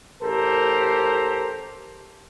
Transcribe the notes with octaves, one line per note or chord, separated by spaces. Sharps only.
A1 G4 A4 A#4 C5 A#5